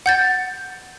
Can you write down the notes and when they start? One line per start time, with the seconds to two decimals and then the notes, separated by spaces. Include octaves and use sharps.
0.06 F#5 G6 A6